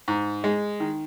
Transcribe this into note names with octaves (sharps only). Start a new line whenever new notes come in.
G#2
G#3
D#3